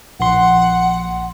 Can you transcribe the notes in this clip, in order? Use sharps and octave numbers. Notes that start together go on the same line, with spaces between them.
A#1 F#5 C6